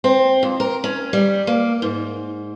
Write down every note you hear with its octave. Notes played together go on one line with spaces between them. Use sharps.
C4
F2
A#4
C#4
G3
A#3
G#2